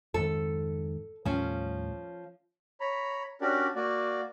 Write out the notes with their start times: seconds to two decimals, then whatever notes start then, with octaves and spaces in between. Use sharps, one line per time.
0.14 F2 G#2 D#3 A4
1.25 D#2 A2 F3 G3 C#4
2.80 C#5 A#5 B5
3.41 C#4 D4 F#4 G4 A#4 D5
3.75 A#3 F#4 D5